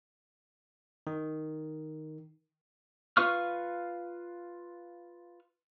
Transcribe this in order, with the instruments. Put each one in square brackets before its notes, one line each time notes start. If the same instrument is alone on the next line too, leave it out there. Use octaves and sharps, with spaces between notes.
[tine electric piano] D#3
[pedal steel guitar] F4 B4 F5 C#6 F6